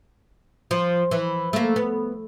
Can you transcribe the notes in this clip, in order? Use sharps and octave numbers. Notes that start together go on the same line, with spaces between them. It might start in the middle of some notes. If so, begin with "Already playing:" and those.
F3
E3
A3 A#3
B3